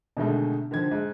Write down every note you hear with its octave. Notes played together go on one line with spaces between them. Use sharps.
B2 D3 D#3 G#3 A3 D#4
D3 D#3 F3 G#6
G#2